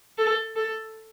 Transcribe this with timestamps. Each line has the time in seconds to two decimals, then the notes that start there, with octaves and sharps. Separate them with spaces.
0.18 A4
0.56 A4